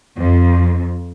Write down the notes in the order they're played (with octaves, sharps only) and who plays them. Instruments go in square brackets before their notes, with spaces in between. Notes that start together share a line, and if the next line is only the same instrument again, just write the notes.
[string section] F2